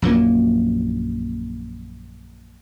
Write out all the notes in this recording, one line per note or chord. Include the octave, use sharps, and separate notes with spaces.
A#1 F#2 F3 A#3